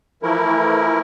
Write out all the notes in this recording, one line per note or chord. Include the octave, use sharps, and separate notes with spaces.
E3 F3 A3 E4 A#4